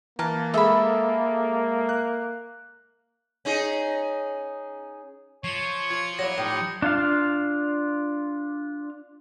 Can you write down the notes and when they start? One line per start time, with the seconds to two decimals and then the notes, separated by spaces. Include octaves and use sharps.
0.19 E3 A#3 A5 A#5 F6
0.54 G#3 G#4 A4 E5 B5
1.89 F#6
3.45 C#4 D#4 G#4
5.44 F3 C#5 C7 C#7
5.90 F4 G#6 C#7
6.19 F#3 A#3 E4 A#6 C#7
6.37 A2 D#4 G4
6.82 D4 F4 F5